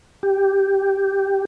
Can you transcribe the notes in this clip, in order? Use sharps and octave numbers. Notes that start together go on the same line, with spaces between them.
G4